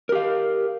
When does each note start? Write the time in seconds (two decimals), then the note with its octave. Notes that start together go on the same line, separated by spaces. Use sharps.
0.09 A#4
0.12 G4
0.15 F5